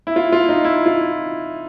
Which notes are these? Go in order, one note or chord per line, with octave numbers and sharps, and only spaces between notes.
E4
F4
F4
D#4
E4
F4